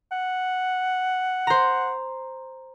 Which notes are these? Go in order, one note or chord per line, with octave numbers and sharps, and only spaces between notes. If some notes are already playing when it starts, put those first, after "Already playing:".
F#5
C5 A#5